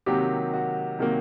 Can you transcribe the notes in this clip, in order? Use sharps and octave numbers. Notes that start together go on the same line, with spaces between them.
C3 D#3 F#3 A#3 G4
F#4
C3 D#3 F#3 A#3